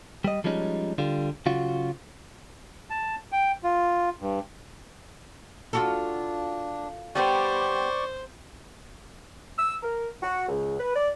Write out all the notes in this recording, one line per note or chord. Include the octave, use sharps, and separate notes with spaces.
G3 D#5
F3 G3 G#3 C#4 D#4
D3 G3 F4
C#3 F#3 F4 F#4
A5
G5
F4
G2
D4 F4 F#4 A4
G3 B3 G4 C5 D5 C#6
E6
A#4
F#4
C#2
B4
D5